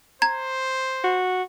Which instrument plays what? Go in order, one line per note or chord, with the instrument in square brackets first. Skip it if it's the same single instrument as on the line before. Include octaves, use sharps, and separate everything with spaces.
[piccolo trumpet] C5 [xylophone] A#5 G#6
[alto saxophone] F#4